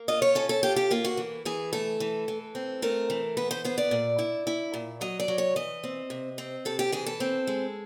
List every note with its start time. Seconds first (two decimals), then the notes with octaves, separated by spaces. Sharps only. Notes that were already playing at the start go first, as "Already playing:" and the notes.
Already playing: A#3
0.08 F4 D#5
0.22 C#5
0.35 C#4 A4
0.49 A4
0.63 F4 G4
0.76 G4
0.91 A#3 F4
1.05 F#4
1.17 E3
1.45 E3 G#4
1.73 A3 A4
2.00 E3
2.28 E3
2.55 C4
2.82 A3 A#4
3.10 E3
3.37 B3 B4
3.51 C5
3.64 B3 C5
3.78 D5
3.91 A#2
4.19 E4
4.47 E4
4.74 A#2
5.01 F#3 D#5
5.20 D5
5.28 F#3
5.38 C#5
5.56 E3 D#5
5.84 C4
6.10 C3
6.38 C4
6.65 C3 A4
6.79 G4
6.92 E3 G#4
7.06 A4
7.20 C4
7.47 G#3